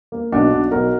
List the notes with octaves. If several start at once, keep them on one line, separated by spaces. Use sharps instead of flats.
A#3
B1 D4 F#4
B1
B1 F#4 A#4